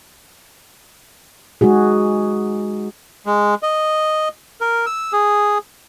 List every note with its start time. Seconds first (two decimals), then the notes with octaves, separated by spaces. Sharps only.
1.61 G#3 D#4 F#4 G#4
3.26 G#3
3.63 D#5
4.61 A#4
4.86 E6
5.13 G#4